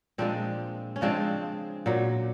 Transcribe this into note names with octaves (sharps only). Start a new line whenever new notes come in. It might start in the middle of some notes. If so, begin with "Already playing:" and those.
A#2 F3 G#3 C4 D4
C#4
C#3 F3 G#3 C4 D4
A#2 F#3